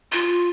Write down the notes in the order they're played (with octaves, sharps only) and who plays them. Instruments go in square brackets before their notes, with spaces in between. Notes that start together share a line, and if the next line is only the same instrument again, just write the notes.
[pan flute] F4